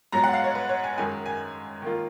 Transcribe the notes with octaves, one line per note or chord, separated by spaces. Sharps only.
G#2 F#3 B3 A#5
F#5
F5
C#5
B4
C#5
G#5
F#2 D#3 G#3 G#5
G#5
D#3 A#3 F4